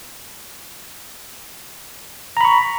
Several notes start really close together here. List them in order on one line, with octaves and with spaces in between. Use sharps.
A#5 B5 C#6